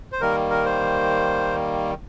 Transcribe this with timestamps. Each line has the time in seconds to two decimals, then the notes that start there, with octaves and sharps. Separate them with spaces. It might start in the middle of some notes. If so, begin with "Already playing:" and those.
0.12 C5
0.21 D#3 G3 A#3 A#4
0.50 A#4
0.65 C5